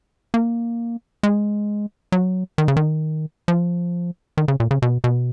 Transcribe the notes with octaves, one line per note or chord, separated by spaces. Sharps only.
A#3
G#3
F#3
D#3
C#3
D#3
F3
D#3
C#3
A#2
C#3
B2
B2